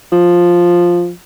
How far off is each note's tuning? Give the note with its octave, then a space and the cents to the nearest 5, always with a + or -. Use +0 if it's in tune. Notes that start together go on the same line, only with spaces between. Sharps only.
F3 +5